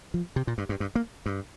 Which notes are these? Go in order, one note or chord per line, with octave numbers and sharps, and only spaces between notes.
F3
C3
A#2
G2
G2
G2
A#3
G2